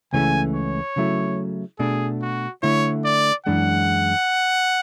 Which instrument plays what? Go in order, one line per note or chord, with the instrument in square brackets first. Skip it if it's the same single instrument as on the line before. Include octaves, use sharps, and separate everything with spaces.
[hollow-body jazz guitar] C#2 C#3 E3 A3 C#4 [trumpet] G#5
[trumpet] C#5
[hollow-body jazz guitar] C#3 F#3 A3 E4
[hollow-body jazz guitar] B2 A3 D4 [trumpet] G#4
[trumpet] F#4
[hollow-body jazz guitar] D3 A3 E4 [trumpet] C#5
[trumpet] D5
[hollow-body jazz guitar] F#2 E3 G#3 D4 [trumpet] F#5